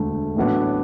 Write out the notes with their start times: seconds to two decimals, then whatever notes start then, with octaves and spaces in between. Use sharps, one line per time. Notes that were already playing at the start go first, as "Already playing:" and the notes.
Already playing: E1 D2 D3 A3
0.36 A1 A2 F#3 B3 D4